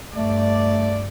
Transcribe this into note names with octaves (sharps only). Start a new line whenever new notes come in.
G2 A3 D5